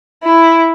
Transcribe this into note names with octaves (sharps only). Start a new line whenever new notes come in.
E4